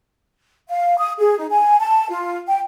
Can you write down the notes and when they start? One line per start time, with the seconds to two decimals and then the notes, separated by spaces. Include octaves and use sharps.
0.69 F5
0.98 D#6
1.19 G#4
1.38 D#4
1.50 G#5
1.80 A5
2.10 F4
2.48 G5